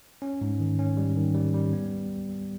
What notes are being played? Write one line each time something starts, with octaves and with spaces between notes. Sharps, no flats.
C#4
G#2
D#3
C#4
G3
D#3
G3
G3
B3